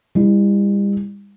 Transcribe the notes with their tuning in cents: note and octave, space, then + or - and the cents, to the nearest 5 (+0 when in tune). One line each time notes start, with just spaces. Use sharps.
G3 +40 E4 +0